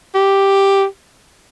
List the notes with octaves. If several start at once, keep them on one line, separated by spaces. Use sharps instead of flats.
G4